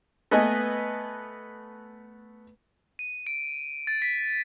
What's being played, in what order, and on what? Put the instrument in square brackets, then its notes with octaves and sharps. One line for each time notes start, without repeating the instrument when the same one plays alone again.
[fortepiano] A3 B3 B4 D#5 G#5
[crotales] D#7
D7
A6
B6